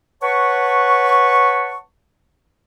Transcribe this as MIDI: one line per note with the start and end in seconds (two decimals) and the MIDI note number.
0.22 1.77 71
0.22 1.77 73
0.22 1.77 78
0.22 1.77 81
0.22 1.77 85